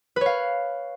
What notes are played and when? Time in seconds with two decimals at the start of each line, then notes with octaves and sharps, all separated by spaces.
0.16 B4
0.21 C#5
0.26 F5